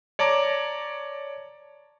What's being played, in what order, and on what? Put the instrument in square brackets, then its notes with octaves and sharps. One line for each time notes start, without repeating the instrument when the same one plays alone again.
[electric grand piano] C#5 D5 A5 A#5 D6